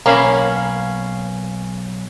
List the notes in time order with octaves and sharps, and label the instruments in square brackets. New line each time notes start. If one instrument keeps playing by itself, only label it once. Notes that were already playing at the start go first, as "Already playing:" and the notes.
[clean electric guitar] B1 F5 B5 [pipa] A#3 C#4